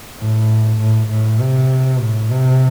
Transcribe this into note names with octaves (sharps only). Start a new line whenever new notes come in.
A2
A2
A2
C3
A2
C3